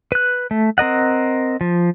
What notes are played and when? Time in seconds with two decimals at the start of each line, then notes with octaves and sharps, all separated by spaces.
0.12 B4 F#6
0.51 A3
0.78 C4 A#4 D#5 F#5
1.61 F3